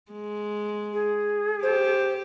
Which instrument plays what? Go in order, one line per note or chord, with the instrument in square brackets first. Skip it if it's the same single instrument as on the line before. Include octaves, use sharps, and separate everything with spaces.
[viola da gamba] G#3
[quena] G#4
[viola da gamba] G4 [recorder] C5